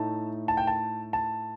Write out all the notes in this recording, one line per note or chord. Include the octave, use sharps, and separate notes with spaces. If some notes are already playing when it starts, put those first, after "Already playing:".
Already playing: A2 A3 D#4 A5
A5
G5
A5
A5